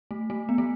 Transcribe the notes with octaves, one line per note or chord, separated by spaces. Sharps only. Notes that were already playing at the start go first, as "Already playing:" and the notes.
A3
A3
B3
A3